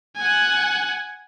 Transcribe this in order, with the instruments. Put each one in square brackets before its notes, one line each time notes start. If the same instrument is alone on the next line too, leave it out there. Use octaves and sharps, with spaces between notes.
[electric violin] F#5 G#5